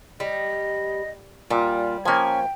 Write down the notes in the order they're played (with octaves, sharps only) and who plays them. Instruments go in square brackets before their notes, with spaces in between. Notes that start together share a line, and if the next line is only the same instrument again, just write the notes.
[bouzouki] G3 [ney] D#5
[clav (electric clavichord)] A#2 [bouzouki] G3 [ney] F4
[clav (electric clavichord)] F3 A#3 [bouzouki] C#4 G#5 [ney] G5